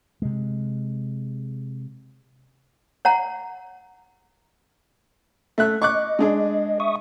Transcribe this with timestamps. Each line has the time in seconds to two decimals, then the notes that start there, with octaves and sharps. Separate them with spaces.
0.22 C3 G#3
3.05 C#5 F#5 A#5
5.58 A3 E5 F#6
5.82 D#5 C#6 D6 F#6
6.19 G#3 D4 G#4
6.80 E5 C#6 D#6